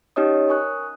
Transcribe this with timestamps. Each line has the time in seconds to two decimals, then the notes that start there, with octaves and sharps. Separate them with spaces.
0.16 C#4 D#4 G4 C#5 D#5 D#6
0.48 A#4 G#5 C#6 D#6 F#6